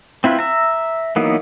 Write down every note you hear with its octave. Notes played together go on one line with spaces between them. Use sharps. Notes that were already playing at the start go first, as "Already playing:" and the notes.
C4 E4 F4 B4
E5 A#5
E3 F#3 A#3 B3 D#4